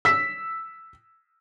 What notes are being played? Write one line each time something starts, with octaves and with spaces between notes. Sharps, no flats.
E6 B6